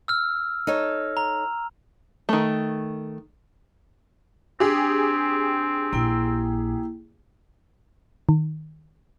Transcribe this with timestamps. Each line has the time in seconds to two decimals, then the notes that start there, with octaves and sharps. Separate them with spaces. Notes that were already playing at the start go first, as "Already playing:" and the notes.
0.08 E6 F6
0.67 D#4 A4 C#5
1.17 A#5
2.29 D#3 A3
4.60 C4 D4 G4 G#4
5.93 A#1 A#3 E4 G5
8.29 D#3